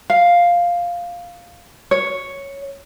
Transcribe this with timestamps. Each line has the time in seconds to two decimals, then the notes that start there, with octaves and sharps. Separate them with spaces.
0.10 F5
1.91 C#5